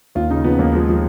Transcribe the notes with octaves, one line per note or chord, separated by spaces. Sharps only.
D#2 F4
C#3 D#4
F3 B3
D#2 A#3
F3 G#3
F3